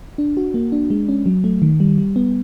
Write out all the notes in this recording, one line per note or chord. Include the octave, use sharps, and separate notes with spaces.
D4
F#4
A#3
D4
G#3
C#4
F#3
A3
D#3
G3
G3
B3